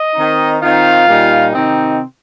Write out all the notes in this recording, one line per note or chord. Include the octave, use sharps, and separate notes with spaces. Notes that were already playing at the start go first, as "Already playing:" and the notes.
Already playing: D#5
D#3 C4 D#4
D#3 C4 D#4 F4 F5
A#2 G3 D#4
C3 D#3 C4 D#4